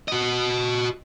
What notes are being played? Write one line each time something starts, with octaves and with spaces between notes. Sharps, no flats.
F#4 D#5